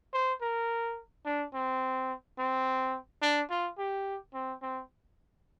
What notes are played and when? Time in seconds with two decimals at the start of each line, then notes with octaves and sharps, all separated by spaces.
0.14 C5
0.42 A#4
1.26 D4
1.54 C4
2.39 C4
3.22 D4
3.50 F4
3.78 G4
4.34 C4
4.62 C4